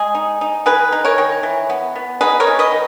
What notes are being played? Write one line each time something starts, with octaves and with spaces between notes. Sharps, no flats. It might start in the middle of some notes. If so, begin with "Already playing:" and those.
Already playing: G#3 G#4
D#4
D#4
D#3 G#4 B4
D#4
A#4 C#5
D#3
E3
B3
B3
D#4 G#4 B4
A#4 C#5
D#4
B4 D#5
D#3